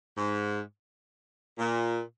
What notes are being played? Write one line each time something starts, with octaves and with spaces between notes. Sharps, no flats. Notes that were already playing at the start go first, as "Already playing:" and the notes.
G#2
A#2